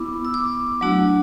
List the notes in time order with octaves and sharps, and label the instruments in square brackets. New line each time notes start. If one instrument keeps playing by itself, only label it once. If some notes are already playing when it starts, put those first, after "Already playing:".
Already playing: [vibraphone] B3 E4 D6
E6
D6
F#3 A3 D4 F#4